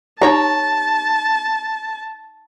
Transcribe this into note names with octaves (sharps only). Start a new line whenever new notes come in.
D#4 G4 C#5 A5 A#5